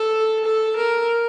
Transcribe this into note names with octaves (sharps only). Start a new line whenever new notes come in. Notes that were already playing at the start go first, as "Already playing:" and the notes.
Already playing: A4
A4
A#4